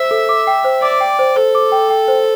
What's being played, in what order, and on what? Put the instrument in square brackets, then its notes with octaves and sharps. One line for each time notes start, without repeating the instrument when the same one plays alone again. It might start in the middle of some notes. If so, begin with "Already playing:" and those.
Already playing: [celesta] C5 [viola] E5
[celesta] A4
D6
G5
C5
[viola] D5 [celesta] D6
[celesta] G5
C5
[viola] A4 [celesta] C5
[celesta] D6
G5
G5
C5